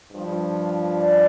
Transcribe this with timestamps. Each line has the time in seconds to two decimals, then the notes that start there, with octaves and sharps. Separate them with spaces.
0.11 G2 F3
0.96 D5